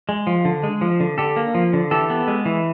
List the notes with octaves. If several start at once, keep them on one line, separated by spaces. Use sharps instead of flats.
G#3
F3
D3
G#3
F3
D3
D3 G4 A4
A#3
F3
D3
E3 G4 A4
B3
G#3
E3